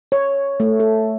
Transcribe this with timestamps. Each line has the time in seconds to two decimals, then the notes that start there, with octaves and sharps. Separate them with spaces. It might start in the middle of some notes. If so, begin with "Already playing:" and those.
0.12 C#5
0.60 A3
0.80 A4